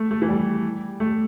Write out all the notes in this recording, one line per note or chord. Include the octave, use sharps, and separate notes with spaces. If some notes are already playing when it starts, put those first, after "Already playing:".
Already playing: A3
A3
E3
G3
A3